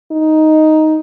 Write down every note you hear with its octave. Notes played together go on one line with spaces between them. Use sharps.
D#4